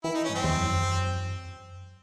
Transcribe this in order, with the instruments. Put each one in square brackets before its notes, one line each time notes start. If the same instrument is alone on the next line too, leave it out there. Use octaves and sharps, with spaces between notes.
[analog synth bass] E3 [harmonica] E4
[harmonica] D#4
C#4
[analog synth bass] G#2
[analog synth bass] F#2 [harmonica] C4
[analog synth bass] E2
F#2